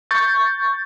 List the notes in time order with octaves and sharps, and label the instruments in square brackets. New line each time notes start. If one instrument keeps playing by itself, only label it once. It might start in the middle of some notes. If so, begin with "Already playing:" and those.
[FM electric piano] C#6 G6 A6